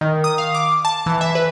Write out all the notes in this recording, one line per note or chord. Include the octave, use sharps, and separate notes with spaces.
D#3
D#6
F5
D6
A5
E3
E5
B4